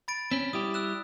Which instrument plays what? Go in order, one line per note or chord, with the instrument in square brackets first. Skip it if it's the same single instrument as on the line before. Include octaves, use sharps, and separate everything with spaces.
[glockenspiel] B5 A6 D7
[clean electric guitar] C4 C#4 [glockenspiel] B6
[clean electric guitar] G3 E4 G4 [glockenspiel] D#6
[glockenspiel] E6 F#6 E7